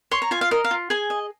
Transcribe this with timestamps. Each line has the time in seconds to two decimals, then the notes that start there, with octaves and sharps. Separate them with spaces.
0.11 C#5 C6
0.22 A#5
0.31 F4 G#5
0.41 F5
0.51 A#4 D#5
0.64 F5
0.71 F4
0.90 G#4 G#5
1.10 D#5